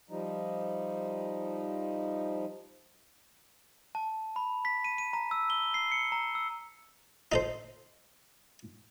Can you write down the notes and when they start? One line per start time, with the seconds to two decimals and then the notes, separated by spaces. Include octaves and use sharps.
0.10 F3 G3 D#4
3.95 A5
4.36 B5
4.65 B6
4.84 D#7
4.98 D#7
5.13 A#5
5.31 E6
5.50 G7
5.74 C7
5.92 C#7
6.12 A#5
6.35 E6
7.32 D#4 A4 C5